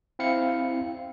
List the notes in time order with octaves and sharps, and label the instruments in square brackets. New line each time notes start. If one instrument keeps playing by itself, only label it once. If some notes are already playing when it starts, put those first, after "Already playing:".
[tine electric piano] C4 E4 F5 C#7